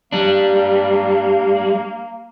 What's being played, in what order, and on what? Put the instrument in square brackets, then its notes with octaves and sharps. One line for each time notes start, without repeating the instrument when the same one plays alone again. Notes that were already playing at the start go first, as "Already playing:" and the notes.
[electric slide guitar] G3 D4 [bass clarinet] A#3